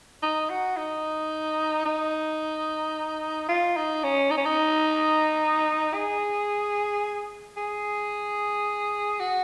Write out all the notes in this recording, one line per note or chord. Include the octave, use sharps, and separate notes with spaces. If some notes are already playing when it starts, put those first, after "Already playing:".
D#4
F#4
D#4
D#4
F4
D#4
C#4
D#4
C#4
D#4
G#4
G#4
F#4